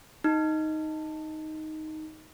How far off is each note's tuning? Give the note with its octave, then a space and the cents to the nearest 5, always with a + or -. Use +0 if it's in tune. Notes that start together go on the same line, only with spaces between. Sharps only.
D#4 +5